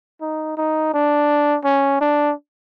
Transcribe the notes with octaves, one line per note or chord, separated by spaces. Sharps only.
D#4
D#4
D4
C#4
D4